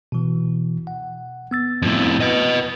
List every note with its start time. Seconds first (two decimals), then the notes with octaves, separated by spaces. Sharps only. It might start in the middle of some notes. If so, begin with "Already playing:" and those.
0.12 B2 E3
0.87 F#5
1.51 B3 E6 A6
1.82 F2 A2
2.20 B4 D#5